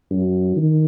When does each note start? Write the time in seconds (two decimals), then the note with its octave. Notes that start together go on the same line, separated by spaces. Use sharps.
0.11 F#2
0.56 D#3